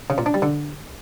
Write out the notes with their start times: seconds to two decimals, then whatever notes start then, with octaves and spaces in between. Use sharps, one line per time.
0.10 C#3
0.18 A#2
0.26 D4
0.34 G3
0.42 D3